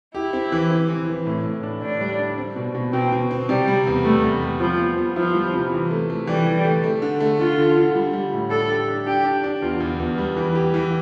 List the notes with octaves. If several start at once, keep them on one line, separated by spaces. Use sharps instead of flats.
E4 G4
C4
E3
C4
E3
E3
A2
A2
D4
A2 D4
G3
D4
C4
B2
B2
B2 C4
B2
C4
C3 G3
G3
E2
G3 A3
E2
G3
F3 G3
B3
B3
F3 E4
G3
C3
E3
A3
A3
E3 G3
E3
A3
A3
D3
A3
D3 F4
D3
D3
G3
G3
A2
D4 A4
G4
D4
D4 G4
D4
D4
E2 F4
E2
E2
G3
E3
G4
E3